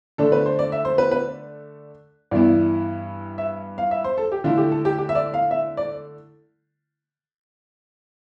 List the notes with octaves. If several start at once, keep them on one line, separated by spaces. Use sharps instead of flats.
D3 A3 D4 A4
B4
C5
D5
E5
C5
B4
B4
G2 E3 B3 E4 D5
E5
F5
E5
C5
A4
G4
D3 A3 E4 F4
G4
A4
G4
G4
E5
D5
F5
E5
D5